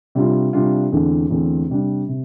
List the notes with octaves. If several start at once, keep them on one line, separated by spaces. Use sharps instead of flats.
C3 G3 D4 F4
C3 G3 D4 F4
E2 D3 A3 C4
E2 D3 A3 C4
C3 G3 D4
C3